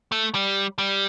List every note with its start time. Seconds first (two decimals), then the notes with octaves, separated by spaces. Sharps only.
0.12 A3
0.35 G3
0.78 G3